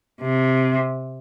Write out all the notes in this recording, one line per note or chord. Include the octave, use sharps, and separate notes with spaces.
C3